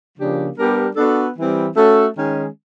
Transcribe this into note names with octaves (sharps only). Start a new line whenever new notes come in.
C#3 F3 A#3 D4 G4
G3 B3 D4 G4 A#4
B3 D4 F#4 A4
E3 G3 C4
A3 C#4 F#4 A4
D#3 G#3 C#4